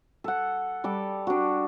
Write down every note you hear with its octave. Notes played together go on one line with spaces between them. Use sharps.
A4 F#5
G3 A4 D6
D4 F#4